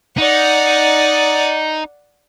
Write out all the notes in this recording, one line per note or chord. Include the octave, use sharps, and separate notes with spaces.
D#4 D5 F#5